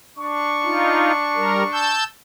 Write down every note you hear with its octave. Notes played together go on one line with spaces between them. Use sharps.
D4 C#6
D#4 F4
G3 A#4
A5 E6 G6